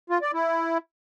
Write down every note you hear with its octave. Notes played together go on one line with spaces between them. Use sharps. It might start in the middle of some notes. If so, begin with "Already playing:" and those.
F4
D5
E4